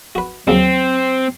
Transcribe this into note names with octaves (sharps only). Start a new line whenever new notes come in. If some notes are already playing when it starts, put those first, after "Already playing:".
F#4 B4
D#2 C#3 F#3 C4